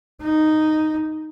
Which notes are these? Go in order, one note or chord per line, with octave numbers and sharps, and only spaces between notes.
D#4